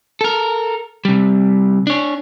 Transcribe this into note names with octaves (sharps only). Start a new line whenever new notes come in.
A4 A#4
C3 G3
D4 C#5